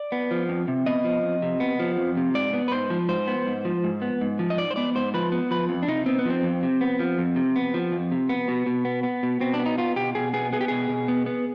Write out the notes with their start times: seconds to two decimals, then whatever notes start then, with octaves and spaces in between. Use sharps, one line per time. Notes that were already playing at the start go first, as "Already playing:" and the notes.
Already playing: D5
0.12 B3
0.31 F3
0.49 F2
0.68 C3
0.86 B3 D#5
1.04 F3
1.23 F2
1.42 C3
1.60 B3
1.79 F3
1.97 F2
2.17 C3
2.34 G#2 D5
2.53 B3
2.68 B4
2.72 G#2 C5
2.90 F3
3.09 G#2 C5
3.27 B3
3.46 G#2
3.65 F3
3.84 G#2
4.02 B3
4.21 G#2
4.39 F3
4.50 D#5
4.58 G#2 D5
4.71 C5
4.76 B3 D5
4.95 G#2 C5
5.14 F3 B4
5.32 B3
5.51 F3 B4
5.69 F2
5.83 D4
5.88 C3 D#4
6.06 B3 C4
6.19 B3
6.25 F3 C4
6.43 F2
6.63 C3
6.81 B3
6.99 F3
7.18 F2
7.36 C3
7.56 B3
7.74 F3
7.92 F2
8.12 C3
8.29 B3
8.48 B2
8.66 B2
8.85 B3
9.03 B3
9.23 B2
9.40 B2 C4
9.54 D4
9.60 B3
9.66 D#4
9.78 B3 F4
9.96 B2 G4
10.15 B2 G#4
10.34 B3 G#4
10.53 B3 G#4
10.61 G4
10.68 B2 G#4
10.89 B2
11.08 B3
11.26 B3